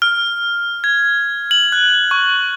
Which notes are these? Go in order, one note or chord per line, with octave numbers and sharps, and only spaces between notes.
F6
G#6
F#7
F#6
C#6